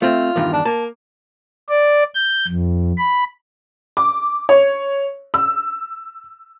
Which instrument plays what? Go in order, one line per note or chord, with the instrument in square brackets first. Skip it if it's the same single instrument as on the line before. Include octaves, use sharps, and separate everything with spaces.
[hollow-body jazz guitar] A3 C4 [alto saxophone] F4
[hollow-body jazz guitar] E2 G2 D#3
[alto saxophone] D4
[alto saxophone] A#3 [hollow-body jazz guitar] A5
[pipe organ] D5
G6
F2
B5
[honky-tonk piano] D6
C#5
E6